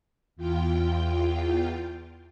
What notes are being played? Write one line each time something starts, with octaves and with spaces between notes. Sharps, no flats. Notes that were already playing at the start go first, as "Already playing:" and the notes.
E2 F4 G5